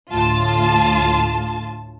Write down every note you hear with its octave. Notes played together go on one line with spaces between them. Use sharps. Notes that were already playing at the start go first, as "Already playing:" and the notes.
D2 A2 F4 A5